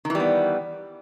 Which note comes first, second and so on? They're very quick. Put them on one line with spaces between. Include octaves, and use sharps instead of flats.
D#3 E3 G3 B3